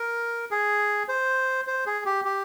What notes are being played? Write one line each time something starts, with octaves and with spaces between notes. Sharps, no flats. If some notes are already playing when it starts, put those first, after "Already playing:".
Already playing: A#4
G#4
C5
C5
G#4
G4
G4